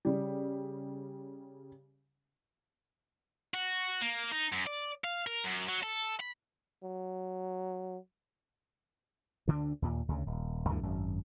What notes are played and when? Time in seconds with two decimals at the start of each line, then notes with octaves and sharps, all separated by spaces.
0.05 C#3 G3
3.54 F#4
4.01 A#3
4.32 D#4
4.52 F#2
4.67 D5
5.04 F5
5.26 A#4
5.44 F#2
5.68 F#3
5.83 A4
6.20 B5
6.83 F#3
9.48 D2 D3 G3 D4
9.82 D#2 A#2
10.08 D2 C#3
10.27 D#1
10.69 D2 G2 D3 E3
10.83 G#1 F#2